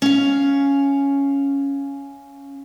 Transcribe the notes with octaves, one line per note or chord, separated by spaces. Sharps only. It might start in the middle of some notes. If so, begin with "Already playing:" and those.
C#4 F5